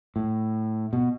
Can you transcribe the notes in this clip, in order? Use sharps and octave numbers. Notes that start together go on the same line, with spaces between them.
A2
B2